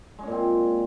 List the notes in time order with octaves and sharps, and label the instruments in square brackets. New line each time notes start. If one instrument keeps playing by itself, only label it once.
[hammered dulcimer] G#3
C#4
A#2
C4